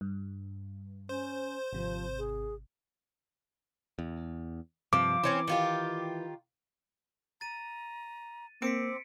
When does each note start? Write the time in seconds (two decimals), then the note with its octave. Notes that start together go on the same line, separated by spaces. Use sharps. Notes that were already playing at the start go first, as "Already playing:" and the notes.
0.01 G2
1.09 C#4 C5
1.73 G#1 C3 F3
2.19 G#4
3.99 E2
4.93 G2 C3 F3 D6
5.23 E3 C4 C#4 C5
5.47 D#3 F4 G4
7.41 A#5 A6 D#7
8.62 A#3 C4 D6 B6 C#7 D7